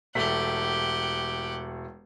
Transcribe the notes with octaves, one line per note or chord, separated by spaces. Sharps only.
E1 A3 G4 F#5 B6